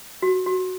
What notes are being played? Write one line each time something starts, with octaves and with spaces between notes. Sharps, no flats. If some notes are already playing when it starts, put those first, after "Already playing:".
F#4
F#4